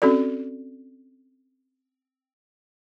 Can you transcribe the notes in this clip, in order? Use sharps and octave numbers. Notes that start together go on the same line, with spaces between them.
C4 C#4 F#4 A4 D5